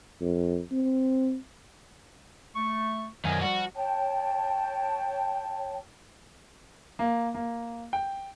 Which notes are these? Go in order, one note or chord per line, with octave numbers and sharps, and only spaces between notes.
F2
C4
A3 C#6
F#2 D#3 D#5 G#5
F3 G3 F#4
C#5 G5 A5
A#3
A#3
G5